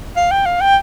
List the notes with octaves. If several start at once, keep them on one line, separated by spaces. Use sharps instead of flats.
F5
G5
F5
G5